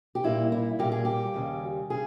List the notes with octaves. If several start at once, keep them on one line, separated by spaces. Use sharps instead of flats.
G4
A#2 G3 A#3 E4
E4
A#2 G3 A#3 G4
G#4
G4
D#2 C#3 G3
C#3 G3 G#4